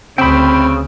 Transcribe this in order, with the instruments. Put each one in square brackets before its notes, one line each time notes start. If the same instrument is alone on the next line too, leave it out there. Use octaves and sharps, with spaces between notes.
[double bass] D2 [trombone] C#3 [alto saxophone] C4 [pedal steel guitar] G5 B5